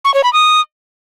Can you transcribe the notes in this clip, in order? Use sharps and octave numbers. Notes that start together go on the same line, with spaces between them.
C#6
C#5
B5
D#6